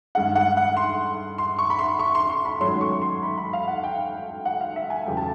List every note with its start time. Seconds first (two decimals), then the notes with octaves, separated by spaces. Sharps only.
0.15 G2 D#3 G#3 F#5
0.35 F#5
0.57 F#5
0.77 C6
1.38 C6
1.59 C#6
1.70 B5
1.79 C6
1.99 C#6
2.15 C6
2.30 C6
2.45 B5
2.60 G#2 D#3 F#3 A3 C#4 C6
2.81 C#6
3.02 C6
3.23 B5
3.38 B5
3.53 F5
3.68 F#5
3.84 G5
4.45 F#5
4.61 F5
4.76 E5
4.90 G#5
5.06 E2 C#3 F#3 A3 G5
5.17 A5